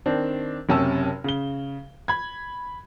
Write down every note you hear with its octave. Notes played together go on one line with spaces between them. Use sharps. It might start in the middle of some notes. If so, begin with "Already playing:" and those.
D#3 C4 D4
F#1 C3 C#4 G5 A5 E6
C#3 G7
B5 G#6